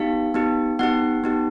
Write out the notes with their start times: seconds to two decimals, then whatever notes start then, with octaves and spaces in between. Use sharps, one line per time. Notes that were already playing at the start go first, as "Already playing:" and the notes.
Already playing: B3 D#4 G4 F5
0.34 B3 D#4 G4
0.79 B3 D#4 G4 F#5
1.24 B3 D#4 G4